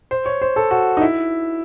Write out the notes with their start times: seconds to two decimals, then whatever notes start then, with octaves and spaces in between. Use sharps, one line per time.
0.11 C5
0.26 C#5
0.42 C5
0.56 A4
0.71 F#4
0.97 D#4
1.01 E4